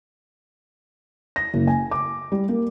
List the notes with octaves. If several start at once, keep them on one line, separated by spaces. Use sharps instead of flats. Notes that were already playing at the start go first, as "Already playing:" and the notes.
A#6
F#1
G#5
D6
G3
A#3